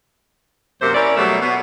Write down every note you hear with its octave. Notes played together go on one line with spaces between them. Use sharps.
F#2 C3 A#3 C5
C#4 E4 A#4 D5
B2 F#3 G3 A3
B2 B3